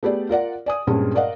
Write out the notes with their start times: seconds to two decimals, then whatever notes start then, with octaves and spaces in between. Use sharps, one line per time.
0.03 A3 B3 G4 G#4 D5
0.29 F4 A#4 D5 F#5
0.66 D5 G#5 D#6
0.87 G2 A#2 G#3 C4 C#4
1.15 A#4 D5 D#5 F5 F#5